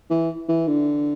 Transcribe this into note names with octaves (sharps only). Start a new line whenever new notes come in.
E3
E3
D3